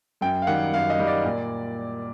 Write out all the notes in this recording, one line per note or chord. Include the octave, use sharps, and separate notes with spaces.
F#2 G5
F5
D#3 G3 F#5
F#2 F5
D#5
D#3 G3
D5
A#2